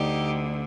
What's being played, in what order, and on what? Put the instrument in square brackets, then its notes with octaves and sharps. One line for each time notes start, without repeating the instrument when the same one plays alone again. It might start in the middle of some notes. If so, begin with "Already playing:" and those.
Already playing: [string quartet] D2 D3 D#4 G4